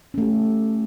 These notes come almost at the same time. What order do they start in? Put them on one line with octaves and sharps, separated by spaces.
C#4 A3 G4